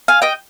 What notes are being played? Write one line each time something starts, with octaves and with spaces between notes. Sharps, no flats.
F5 G#5
D#5 G5